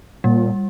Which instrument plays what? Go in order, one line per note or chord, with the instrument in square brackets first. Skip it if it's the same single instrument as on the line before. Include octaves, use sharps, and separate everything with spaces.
[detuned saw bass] A#2 [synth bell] G3